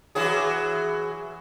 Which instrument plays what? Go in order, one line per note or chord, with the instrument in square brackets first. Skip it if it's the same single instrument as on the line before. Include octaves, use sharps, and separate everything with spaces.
[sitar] E3 F#3 G#4